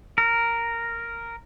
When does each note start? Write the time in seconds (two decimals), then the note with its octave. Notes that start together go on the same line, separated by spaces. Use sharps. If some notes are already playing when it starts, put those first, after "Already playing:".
0.18 A#4